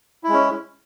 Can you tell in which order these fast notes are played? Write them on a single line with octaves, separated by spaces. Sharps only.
E4 G#3 C#4